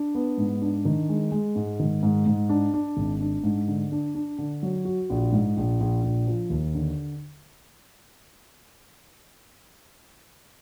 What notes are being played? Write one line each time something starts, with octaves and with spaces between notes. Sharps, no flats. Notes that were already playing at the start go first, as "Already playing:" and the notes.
Already playing: D4
B3
G#2
D4
D#3
G#3
G#3
G#2
D#3
G#2
G#2
D4
D4
G#1
D4
G#2
D3
D4
D4
D3
F#3
F#4
A#1
G#2
A#1
A#1
A#1
F3
D#2
D3